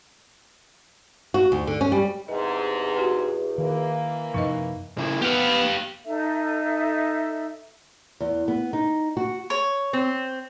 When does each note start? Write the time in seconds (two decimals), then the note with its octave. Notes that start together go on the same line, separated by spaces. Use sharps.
1.34 F#4
1.52 D2
1.67 D3
1.81 C#4
1.92 G3
2.28 E2 G#2 C3 D#5
2.95 F#4 G4 B4
3.58 D#3 E3 A#3
4.34 F#2 C3 F3 D#4 B4 D#5
4.98 C#3 E4
5.22 B3 G4 F5
6.05 D#4 A4 E5
8.20 E2
8.48 B3
8.73 D#4
9.17 F#4
9.50 C#5
9.93 C4